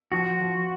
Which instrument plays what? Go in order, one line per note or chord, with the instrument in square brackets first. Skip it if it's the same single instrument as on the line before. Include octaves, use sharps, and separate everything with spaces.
[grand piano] F3 [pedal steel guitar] F#4
[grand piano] F3